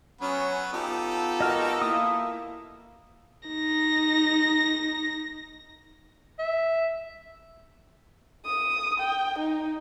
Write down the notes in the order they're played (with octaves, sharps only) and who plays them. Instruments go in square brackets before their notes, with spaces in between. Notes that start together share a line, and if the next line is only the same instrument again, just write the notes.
[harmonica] F#3 B3 B4 [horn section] C#4
[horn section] B3 F4 A4 [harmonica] D#4 G4
[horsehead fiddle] F#4 A#4 [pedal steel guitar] D#5 F6
[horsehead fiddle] A#3 E4 [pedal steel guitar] D#6
[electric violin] D#4 A#6
[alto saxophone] E5
[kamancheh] D#6
G5
D#4